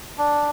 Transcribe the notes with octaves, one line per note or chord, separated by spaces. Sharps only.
D4